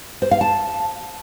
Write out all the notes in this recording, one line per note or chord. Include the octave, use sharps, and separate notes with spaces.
C5
F5
A5